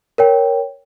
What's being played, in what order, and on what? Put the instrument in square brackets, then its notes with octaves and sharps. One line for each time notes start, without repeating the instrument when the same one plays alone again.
[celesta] A#4 C#5 G5